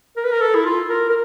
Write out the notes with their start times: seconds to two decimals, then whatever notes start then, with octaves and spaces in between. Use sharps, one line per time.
0.17 A#4
0.24 B4
0.32 A#4
0.41 A4
0.54 E4
0.65 F4
0.89 A#4
1.09 A#4